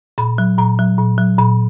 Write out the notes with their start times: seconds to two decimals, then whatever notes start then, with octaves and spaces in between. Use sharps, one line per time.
0.18 A#2 B5
0.38 F#3
0.58 A#2 A#5
0.79 F#3
0.98 A#2
1.18 F#3
1.39 A#2 B5